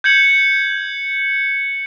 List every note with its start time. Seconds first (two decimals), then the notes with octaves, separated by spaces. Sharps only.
0.04 G6 G#6 C#7 F#7